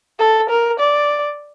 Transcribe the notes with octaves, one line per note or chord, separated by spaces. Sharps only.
A4
A#4
D5